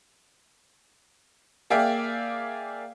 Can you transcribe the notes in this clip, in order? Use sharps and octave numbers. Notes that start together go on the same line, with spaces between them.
A#3 G#4 D5 E5 F5 G5